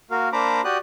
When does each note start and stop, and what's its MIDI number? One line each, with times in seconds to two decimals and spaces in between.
0.11 0.29 58
0.11 0.29 66
0.11 0.29 70
0.11 0.29 77
0.33 0.61 58
0.33 0.61 62
0.33 0.61 72
0.33 0.61 82
0.33 0.61 83
0.33 0.61 86
0.64 0.78 66
0.64 0.78 67
0.64 0.78 74
0.64 0.78 87
0.64 0.78 90